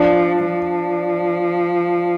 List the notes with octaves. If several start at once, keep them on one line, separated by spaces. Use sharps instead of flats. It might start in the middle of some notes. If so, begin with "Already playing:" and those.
Already playing: F3 D4
F3